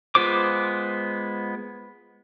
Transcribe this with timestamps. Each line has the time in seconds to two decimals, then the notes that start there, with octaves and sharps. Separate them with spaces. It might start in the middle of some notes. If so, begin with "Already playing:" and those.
0.15 G#3 B3 F4 C5 D6